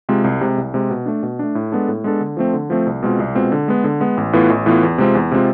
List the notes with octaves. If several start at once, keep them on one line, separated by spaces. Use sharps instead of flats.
C3 G#3 C4 F4
C2
C3 G#3
C2
C3 G#3
B2
A3 D4
B2
A3 D4
A2
G#3 B3 D4 A4
A2
G#3 B3 D4 A4
D3
F3 A3 C4
D3
F3 A3 C4
C2
B2 G#3 C4 F4
C2
B2 G#3 C4 F4
D3
G#3 B3
D3
G#3 B3
A1
A2 E3 B3 F4
A1
A2 E3 B3 F4
E2
C3 G#3 C4 F4
E2
C3 G#3 C4 F4